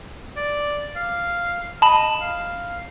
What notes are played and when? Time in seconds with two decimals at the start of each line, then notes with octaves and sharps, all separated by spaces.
0.37 D5
0.96 F5
1.82 D#5 A5 B5
2.21 F5